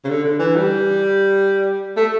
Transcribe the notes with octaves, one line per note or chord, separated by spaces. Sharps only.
C#3
D3
D3
E3
G3
A3